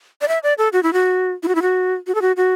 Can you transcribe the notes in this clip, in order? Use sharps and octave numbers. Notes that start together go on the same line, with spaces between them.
D5
E5
D5
A4
F#4
E4
F#4
E4
F#4
E4
F#4
F#4
A4
F#4
F#4